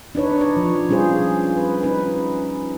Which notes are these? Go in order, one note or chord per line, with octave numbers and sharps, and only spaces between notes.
D4 D#4 B4 C#5
C#5 D5
F3
G3 C#4 F4 G#4 C5
B4
C#4 D#4 B4